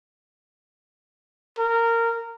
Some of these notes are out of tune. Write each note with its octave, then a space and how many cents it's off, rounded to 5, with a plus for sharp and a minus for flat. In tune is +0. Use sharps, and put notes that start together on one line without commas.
A#4 -15